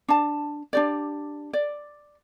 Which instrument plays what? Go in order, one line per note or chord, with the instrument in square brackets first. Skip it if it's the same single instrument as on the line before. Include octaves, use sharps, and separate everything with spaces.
[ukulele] D4 A5
D4 G4 D5
D5